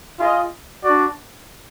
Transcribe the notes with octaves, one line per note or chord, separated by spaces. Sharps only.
F4 G#4 D#5
D4 F#4 D5